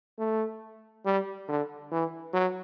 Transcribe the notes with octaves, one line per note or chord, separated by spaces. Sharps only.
A3
G3
D3
E3
F#3